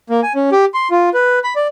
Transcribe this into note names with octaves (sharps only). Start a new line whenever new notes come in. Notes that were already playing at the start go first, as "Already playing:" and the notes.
A#3
G#5
C#4
G4
C6
F4
B4
B5
D5